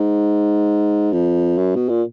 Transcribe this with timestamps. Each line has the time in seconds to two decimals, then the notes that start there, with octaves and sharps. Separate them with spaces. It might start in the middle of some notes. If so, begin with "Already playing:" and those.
Already playing: G#2
1.13 F2
1.58 F#2
1.75 B2
1.89 A#2